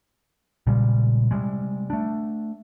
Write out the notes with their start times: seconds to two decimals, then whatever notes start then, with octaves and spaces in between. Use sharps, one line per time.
0.67 A#2 C#3 G3 G#3
1.31 C3 G3 G#3
1.90 A3 D4